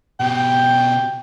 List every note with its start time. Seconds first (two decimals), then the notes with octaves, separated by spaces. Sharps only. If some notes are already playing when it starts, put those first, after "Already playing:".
0.20 B2 G4 G5